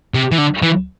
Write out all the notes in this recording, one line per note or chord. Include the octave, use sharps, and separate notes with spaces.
C3
E3
D3
E3